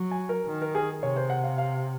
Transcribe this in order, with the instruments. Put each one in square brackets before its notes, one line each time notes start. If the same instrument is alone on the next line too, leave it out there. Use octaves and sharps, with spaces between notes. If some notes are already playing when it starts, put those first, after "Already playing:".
Already playing: [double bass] F#3
[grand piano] G#5
A#4
[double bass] D#3
[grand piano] A#4
G#4
[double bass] C3 [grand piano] C#5
[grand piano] C5
F#5
F5
F5